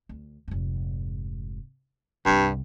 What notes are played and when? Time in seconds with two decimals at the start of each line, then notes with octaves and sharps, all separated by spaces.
0.09 D2
0.48 F1 G#2
2.26 C2 G2 C3